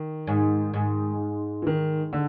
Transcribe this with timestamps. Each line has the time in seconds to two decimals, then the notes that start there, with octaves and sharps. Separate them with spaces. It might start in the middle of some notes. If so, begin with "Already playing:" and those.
Already playing: D#3
0.27 G#2
0.74 G#2
1.62 E3
1.67 D#3
2.13 D3